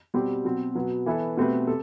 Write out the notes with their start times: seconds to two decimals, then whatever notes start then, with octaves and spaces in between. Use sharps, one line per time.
0.14 B2 G3 C4 G4
0.45 B2 F#3 C4
0.75 B2 F#3 B3
1.06 E3 B3 E4 A4
1.37 B2 A3 C4 G4 B4
1.67 C3 A4